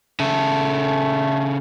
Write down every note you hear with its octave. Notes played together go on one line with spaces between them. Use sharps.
C#3 A3 A4